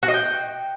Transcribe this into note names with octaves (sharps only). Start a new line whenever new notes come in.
F#4
D#5
G5